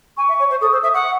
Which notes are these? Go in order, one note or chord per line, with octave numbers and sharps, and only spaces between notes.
G#5 C#6
E5
C#5
C5
A4 D#6
C5 E6
E5 D#6
F#5 C#6